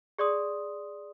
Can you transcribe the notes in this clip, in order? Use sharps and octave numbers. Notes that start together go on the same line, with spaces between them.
G#4 D5 C6 D#6